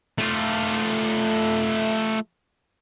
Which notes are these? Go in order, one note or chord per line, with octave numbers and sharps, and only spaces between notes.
A3 F4